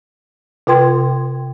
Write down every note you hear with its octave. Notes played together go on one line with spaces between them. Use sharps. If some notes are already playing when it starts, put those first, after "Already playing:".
C3 F4 B4 G5 C6 G#6